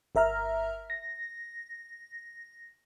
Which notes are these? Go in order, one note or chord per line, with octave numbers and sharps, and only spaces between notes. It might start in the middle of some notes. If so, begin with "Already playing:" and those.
G1 A#4 E5 A#5 F6
A#6